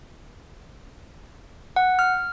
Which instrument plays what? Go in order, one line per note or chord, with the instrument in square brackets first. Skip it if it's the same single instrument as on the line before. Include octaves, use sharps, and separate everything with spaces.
[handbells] F#5
F6